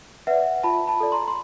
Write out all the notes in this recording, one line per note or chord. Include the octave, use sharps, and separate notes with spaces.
B4 D5 E5 F#5
F4 A5 B5
A5 B5
A4 D5
A#5 C6
C6